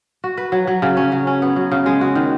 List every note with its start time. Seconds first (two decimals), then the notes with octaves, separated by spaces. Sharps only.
0.24 F#4
0.37 B4
0.52 F#3
0.67 F#3
0.82 C#3
0.97 C#4
1.12 F#3
1.27 C#4
1.42 B3
1.56 F#3
1.72 C#3
1.86 G#3
2.01 F#4
2.15 D#3